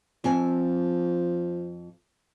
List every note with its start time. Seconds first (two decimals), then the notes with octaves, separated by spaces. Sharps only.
0.24 F2 F3 C4 G#5